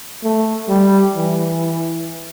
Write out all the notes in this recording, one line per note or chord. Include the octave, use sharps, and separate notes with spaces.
A3
G3
E3